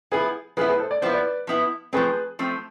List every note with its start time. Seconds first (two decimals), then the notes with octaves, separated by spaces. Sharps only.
0.11 F3 B3 E4 G#4 B4
0.57 F3 B3 E4 G#4 B4
0.68 G#4 B4
0.80 A4 C5
0.91 D5
1.02 F3 B3 E4 C5
1.13 B4 D5
1.47 F3 B3 E4
1.93 F3 A3 C4 G#4 B4
2.39 F3 A3 C4